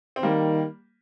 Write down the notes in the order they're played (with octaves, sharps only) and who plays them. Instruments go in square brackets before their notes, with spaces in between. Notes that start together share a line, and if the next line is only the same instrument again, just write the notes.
[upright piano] C4
[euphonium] D#3 [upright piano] G3 A#3